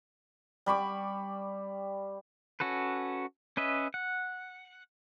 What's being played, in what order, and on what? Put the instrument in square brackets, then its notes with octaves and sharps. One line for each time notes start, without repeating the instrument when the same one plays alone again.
[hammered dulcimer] G3 B5 C#6 D6
[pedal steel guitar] C#4 F#4 A4 B4
C#4 B4 D#5 E5
F#5